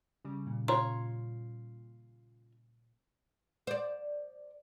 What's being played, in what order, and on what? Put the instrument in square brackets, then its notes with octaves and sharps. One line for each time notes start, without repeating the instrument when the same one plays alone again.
[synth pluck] C#3 G3
A#2
[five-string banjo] F4 C#5 [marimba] A#5 C6
[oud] C5 D5